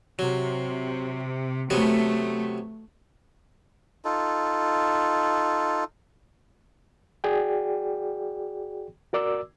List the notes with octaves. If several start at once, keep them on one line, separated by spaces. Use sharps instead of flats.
C3 F#3
C3 F#3 A3 B3
D#4 F4 A4
F#4 G#4 D5 G5
F#4 A#4 D5 D6 E6